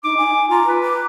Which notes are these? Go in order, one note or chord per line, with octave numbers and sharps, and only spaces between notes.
D#4 D6
G#5
F4 A#5
B4
D6